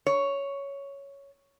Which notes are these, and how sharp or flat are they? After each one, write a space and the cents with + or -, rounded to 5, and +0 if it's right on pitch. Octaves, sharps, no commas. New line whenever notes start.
C#5 +5